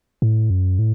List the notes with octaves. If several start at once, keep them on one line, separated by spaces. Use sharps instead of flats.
A2
F#2
A2